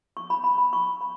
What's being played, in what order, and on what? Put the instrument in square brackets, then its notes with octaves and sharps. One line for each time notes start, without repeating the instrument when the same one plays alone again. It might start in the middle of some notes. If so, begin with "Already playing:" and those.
[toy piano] C#6
B5
B5
B5
C#6
B5